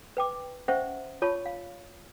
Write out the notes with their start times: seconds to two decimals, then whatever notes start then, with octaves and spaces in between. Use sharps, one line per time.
0.17 B4 G5 D6
0.68 C#4 C5 E5 F#5 C#6
1.22 F4 C#5 A5 B5 C#6
1.46 F5